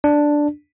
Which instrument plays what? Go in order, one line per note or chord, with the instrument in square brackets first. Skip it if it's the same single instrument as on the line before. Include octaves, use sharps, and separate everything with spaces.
[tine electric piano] D4